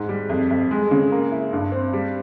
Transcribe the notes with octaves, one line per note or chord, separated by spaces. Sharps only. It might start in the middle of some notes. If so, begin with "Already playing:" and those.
Already playing: G#2
G3
F2
F2
G#3
C#3
A#3
E4
G2
C4
G3